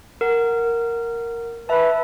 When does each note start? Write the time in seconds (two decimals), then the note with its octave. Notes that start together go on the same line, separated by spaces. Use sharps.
0.21 A#4 F#5
1.69 B4 E5 A5